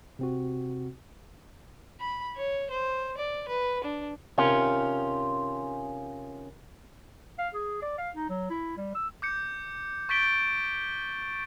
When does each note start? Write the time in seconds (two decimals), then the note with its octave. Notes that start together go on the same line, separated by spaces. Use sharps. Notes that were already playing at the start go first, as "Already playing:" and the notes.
0.19 C3 C4 F#4
2.00 B5
2.37 C#5
2.71 C5
3.17 D5
3.48 B4
3.84 D4
4.38 C3 D#3 C#4 F4
7.39 F5
7.54 G#4
7.82 D5
7.98 F5
8.15 D#4
8.30 F#3
8.50 E4
8.77 G3
8.95 E6
9.22 D6 G6 C#7
10.09 C#6 G6 A6 B6 D7 G7